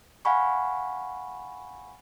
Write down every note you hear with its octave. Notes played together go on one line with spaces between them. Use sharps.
F5 F#5 G#5 B5 C#6